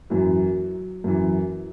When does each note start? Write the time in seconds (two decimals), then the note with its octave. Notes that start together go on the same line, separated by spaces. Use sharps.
0.10 F#2 E3 F#3
1.04 F#2 E3